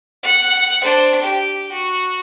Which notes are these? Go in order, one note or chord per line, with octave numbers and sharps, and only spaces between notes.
F#5
D4 C5
G4
F#4